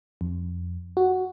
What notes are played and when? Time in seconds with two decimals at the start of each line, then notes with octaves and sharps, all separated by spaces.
0.21 F2
0.97 F#4